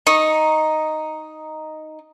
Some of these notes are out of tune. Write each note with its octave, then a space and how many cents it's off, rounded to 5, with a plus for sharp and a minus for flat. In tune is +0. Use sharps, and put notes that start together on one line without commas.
D#4 +0 C#6 -15